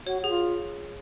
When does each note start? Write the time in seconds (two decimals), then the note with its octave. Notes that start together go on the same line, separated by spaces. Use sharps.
0.06 F#4 C#5
0.22 F#4 G#4
0.30 F4